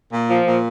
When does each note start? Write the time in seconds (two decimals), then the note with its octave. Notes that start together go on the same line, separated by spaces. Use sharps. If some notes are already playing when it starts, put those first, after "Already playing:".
0.12 A#2
0.29 F3
0.46 A#2